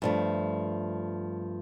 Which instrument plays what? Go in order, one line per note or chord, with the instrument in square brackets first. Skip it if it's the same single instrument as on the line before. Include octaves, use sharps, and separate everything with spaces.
[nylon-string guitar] G2 F3 A3